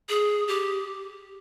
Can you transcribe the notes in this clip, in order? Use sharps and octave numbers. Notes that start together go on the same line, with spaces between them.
G#4
G4